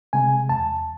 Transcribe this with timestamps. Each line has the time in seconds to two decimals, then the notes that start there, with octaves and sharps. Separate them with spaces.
0.13 C3 G#3 G#5
0.49 E2 A5